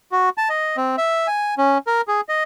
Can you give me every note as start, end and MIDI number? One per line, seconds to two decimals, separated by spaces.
0.12 0.29 66
0.38 0.49 81
0.49 0.76 75
0.77 0.96 60
0.98 1.27 76
1.27 1.55 80
1.58 1.78 61
1.87 2.01 70
2.08 2.21 68
2.29 2.43 75